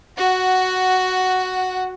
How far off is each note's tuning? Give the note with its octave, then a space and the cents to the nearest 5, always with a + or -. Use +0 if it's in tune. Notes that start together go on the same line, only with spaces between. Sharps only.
F#4 +0 F#5 +10